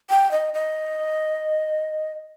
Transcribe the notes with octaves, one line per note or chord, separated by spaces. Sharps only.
G5
D#5
D#5